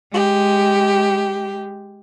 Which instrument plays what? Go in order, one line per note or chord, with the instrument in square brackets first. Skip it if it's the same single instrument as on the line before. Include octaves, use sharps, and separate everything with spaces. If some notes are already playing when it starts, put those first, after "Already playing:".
[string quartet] G#3 G4